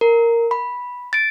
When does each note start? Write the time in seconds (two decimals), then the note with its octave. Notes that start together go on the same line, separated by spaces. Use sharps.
0.01 A#4
0.51 B5
1.13 A6 D7